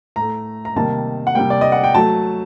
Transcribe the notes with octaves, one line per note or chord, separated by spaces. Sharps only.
A2 A3 A#5
A#5
C3 D#3 G3 A#3 A5
F#5
C3 G3 A#3 G5
D5
D#5
F#5
G5
F#3 A3 A5